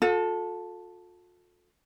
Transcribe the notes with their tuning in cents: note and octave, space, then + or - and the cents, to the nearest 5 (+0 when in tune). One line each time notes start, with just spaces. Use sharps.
F4 +45 A4 +0